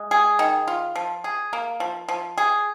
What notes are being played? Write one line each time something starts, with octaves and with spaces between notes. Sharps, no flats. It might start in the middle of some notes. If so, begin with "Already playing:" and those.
Already playing: G#3
G#4
D#3
F4
F3
G#4
A#3
F3
F3
G#4